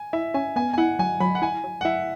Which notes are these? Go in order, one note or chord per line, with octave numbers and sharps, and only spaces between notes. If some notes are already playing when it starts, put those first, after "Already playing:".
Already playing: G#5
E4 E5
C#4 G#5
B3 G#5
G#5
E4 F#5
F#3 G#5
F#3 B5
F#5
E4 G#5
F#3
F#5
E4 E5